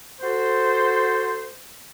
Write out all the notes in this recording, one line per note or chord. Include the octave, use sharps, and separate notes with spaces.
F#4 A4 C5